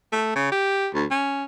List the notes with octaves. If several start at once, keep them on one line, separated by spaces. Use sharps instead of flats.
A3
C#3
G4
D2
C#4